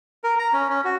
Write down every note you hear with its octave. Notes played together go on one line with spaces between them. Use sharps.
A#4
A#5
C#4
C#4
F#4